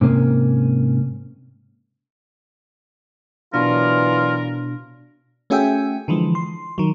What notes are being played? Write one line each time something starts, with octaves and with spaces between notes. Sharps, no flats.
G#2 C3 A#3 C#4
B2 E3 F#3 D4 F4 A#4 D5
A3 C#4 F#4 G#4 E5 G5
D3 E3 F3 G#3
C6
D#3 F#3